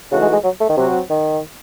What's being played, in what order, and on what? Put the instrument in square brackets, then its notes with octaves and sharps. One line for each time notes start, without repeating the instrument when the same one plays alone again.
[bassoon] C#3 [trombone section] E3 A3 D#4 F#4
[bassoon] G#3
G#3
F#3
A3
D#3
[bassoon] C3 [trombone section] F#3 C4 F#4
[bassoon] D#3